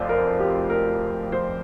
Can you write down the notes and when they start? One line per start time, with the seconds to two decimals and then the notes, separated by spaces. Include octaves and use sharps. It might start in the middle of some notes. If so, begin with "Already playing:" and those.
Already playing: F1 F2 F3 F4 C5 D5
0.09 A#4
0.40 G4
0.70 A#4
1.32 C5